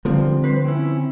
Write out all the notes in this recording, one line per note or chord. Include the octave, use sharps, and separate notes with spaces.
D3 F3 G3 C4
B4 C5
C4 C#4 E4